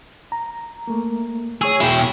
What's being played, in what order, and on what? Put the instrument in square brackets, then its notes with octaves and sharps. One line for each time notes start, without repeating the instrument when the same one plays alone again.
[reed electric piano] A#5
A3 A#3
[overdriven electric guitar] G#4 [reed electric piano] C#5 C#6 E6
[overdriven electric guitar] B2 E4 [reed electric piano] F#4 G5